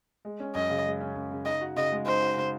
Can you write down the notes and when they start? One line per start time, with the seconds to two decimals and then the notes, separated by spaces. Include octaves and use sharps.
0.25 G#3
0.40 C#4
0.55 F#2 D#5
0.70 C#3
0.85 G#3
1.01 C#4
1.16 F#2
1.31 C#3
1.46 D#4 D#5
1.61 F#4
1.76 C#3 D#5
1.92 G#3
2.06 D#4 C5
2.22 F#4
2.37 C#3